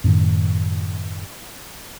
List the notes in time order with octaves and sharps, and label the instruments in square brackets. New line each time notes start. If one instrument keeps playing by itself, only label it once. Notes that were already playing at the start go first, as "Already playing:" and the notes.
[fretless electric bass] F#2 A2 D#3